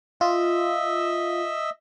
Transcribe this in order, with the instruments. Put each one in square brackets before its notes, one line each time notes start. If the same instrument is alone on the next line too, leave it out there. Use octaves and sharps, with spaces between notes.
[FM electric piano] F4 [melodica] D#5 E5 E6